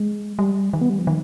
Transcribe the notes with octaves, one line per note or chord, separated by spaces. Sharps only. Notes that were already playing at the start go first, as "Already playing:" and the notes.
Already playing: G#3
G3
D#3
B3
G3
F3
D#3